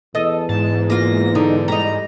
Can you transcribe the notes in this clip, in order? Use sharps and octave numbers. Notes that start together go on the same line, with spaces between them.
E2 A4 D#5
G#2 A5
A#3 F4 A#6
D3 D#4
G3 D#4 A#5